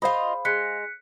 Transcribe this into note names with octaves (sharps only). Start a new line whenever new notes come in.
F4 G#4 C5 D#5 F5 B5
G#3 F#6 B6 C#7